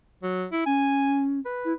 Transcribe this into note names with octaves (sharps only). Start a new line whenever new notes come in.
F#3
E4
C#4 G#5
B4
E4